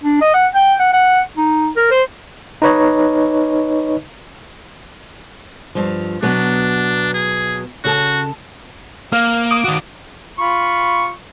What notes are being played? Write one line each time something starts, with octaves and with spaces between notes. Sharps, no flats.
D4
D#5
F#5
G5
F#5
F#5
D#4
A#4
C5
D#4 B4 C#5 D#5
G2 F3
B2 F#3 B3 D4
G#4
C#3 F#4 A4 A5
A#3 F5
D6 D#6 D7
D#3 F#4
F4 B5 C#6